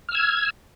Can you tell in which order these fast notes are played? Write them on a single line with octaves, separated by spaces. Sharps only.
F6 E6 G#6